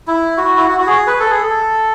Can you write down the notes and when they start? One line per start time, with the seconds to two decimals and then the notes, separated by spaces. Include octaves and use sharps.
0.08 E4
0.37 F#4
0.57 E4
0.68 F#4
0.80 F#4
0.87 G#4
1.07 B4
1.20 A4
1.30 G#4
1.43 A4